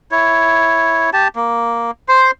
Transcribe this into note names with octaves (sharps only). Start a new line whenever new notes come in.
E4 C#5
G4 A5
A#3
C5 C6